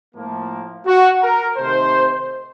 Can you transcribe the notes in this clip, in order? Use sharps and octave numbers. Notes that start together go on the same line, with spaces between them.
A2 F3 A#3
F#4
A#4
C3 D#3 A3 C5